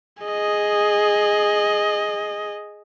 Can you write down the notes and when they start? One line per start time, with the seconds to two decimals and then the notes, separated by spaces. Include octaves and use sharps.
0.23 G#4 D#5